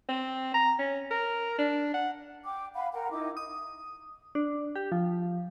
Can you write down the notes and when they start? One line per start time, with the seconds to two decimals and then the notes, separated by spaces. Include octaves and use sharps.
0.09 C4
0.54 A#5
0.79 C#4
1.11 A#4
1.58 D4
1.94 F#5
2.45 G5 D6
2.75 F5 F#5 B5
2.93 A#4 F#5 G5
3.11 D#4 E4 D6
3.37 D#6
4.35 D4
4.76 G4
4.92 F3